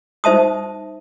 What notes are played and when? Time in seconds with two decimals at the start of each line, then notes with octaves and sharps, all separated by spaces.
0.24 D#4 C5 E5 A5 D#6